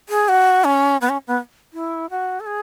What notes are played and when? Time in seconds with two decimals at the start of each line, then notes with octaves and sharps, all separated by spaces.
0.09 G#4
0.29 F#4
0.64 C#4
1.01 B3
1.09 C#4
1.27 B3
1.73 E4
2.10 F#4
2.40 A4
2.46 G#4